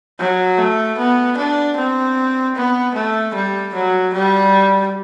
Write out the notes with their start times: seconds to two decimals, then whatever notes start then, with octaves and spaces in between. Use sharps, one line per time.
0.19 F#3
0.58 A3
0.98 B3
1.37 D4
1.76 C4
2.55 B3
2.94 A3
3.34 G3
3.74 F#3
4.14 G3